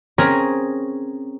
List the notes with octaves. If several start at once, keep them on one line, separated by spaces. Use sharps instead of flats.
C4 C#4 G#4 A#4